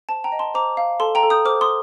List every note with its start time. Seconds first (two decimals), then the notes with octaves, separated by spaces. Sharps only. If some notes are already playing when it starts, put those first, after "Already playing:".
0.09 C5 A5
0.24 G5 A#5
0.32 D#5
0.39 A5 C6
0.54 C5 A#5 D6
0.77 F5
1.00 A4 A5 C6
1.15 G5 A#5
1.23 A4
1.30 D#6 G6
1.45 C5 D6 F6
1.61 C6 D#6